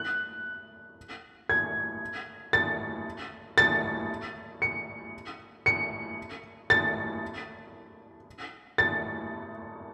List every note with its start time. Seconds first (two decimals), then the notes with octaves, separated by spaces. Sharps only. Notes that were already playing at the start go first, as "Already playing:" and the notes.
Already playing: F#6
1.49 G#6
2.53 A6
3.58 A6
4.62 C#7
5.66 C#7
6.70 A6
8.78 A6